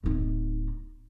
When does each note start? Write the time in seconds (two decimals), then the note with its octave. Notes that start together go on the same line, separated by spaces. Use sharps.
0.03 D1 D#4